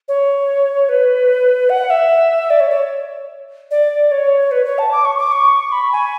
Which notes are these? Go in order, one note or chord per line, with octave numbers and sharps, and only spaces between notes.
C#5
B4
F#5
E5
D5
C#5
C#5
D5
C#5
B4
C#5
A5
D6
C#6
D6
C#6
B5
G#5